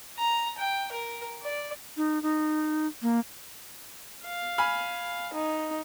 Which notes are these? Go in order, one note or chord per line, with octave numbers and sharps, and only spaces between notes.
A#5
G5
A#4
D5
D#4
D#4
A#3
F5
G#5 B5 F6
D#4